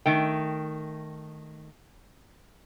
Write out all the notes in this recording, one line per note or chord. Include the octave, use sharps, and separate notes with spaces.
D#3 A3 G5